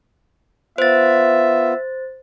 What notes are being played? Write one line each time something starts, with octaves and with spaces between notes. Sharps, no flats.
B3 F4 C5 E5 A6